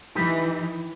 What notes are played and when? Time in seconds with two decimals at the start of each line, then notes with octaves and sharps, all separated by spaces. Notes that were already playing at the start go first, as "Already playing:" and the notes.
0.15 E3 D#4 G4 B4